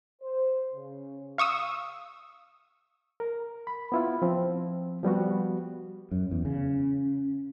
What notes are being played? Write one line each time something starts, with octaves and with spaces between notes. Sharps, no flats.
C5
C#3
F5 C#6 D#6 E6
A#4
B5
B3 E4 F4
F3 C4
F3 G3 B3 F#4
F#2
E2
C#3